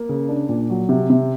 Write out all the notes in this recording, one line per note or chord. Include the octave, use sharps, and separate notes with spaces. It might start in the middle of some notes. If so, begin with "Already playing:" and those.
Already playing: A#3
C#3
D4
A#2
F#3
C3
C3